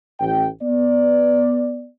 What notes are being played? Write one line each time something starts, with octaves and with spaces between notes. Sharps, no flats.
A1 G5
B3 D5